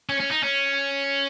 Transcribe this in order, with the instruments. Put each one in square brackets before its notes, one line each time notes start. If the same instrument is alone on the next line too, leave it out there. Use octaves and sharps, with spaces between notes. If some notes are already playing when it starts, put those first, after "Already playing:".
[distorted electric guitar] C#4
C#4
D#4
C#4